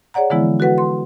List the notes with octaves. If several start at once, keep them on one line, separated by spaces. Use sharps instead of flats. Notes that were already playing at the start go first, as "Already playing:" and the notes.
G#4 C#5 D5 F#5 A#5
D3 E3 F3 G#3 B3 E4
F#4 A4 B4 F#5
C6